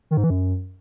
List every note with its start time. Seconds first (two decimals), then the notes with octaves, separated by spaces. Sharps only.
0.11 D#3
0.17 G#2
0.24 E3
0.30 F#2